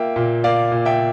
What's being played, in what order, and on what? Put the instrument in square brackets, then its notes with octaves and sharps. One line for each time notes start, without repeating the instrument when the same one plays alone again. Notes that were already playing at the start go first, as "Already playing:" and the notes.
Already playing: [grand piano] A#3 F4 E5 G5
A#2
A#3 D5 F5
A#2
E5 G5